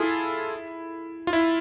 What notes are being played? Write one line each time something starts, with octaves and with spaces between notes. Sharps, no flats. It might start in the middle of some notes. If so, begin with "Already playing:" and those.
Already playing: E4 F4 G#4 A4
F4
E4